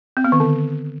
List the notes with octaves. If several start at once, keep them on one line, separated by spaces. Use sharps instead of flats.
C4
B3
D#3
D3